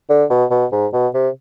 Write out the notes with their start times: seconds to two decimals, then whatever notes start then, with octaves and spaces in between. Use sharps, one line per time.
0.10 D3
0.30 B2
0.51 B2
0.72 G#2
0.93 B2
1.14 C3